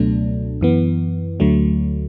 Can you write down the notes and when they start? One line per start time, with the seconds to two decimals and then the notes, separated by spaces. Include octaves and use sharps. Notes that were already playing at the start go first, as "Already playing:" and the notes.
Already playing: C#2 B2 F#3 A3 D4
0.61 F#2 E3 B3
1.40 D2 D3 F#3 A3